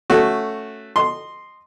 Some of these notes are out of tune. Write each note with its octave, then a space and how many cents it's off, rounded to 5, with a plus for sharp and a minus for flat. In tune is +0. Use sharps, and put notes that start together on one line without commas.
A3 +0 C#4 +0 F#4 +0
D#5 -15 C6 +0